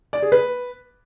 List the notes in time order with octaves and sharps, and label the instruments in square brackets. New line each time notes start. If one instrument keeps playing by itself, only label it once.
[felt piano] D5
G#4
B4